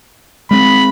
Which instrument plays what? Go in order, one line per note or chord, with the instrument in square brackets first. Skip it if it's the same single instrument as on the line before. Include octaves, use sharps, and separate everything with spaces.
[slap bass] G#3 C4 [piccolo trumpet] B5